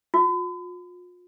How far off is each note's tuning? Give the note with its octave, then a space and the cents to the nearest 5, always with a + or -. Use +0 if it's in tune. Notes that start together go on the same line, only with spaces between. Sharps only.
F4 +40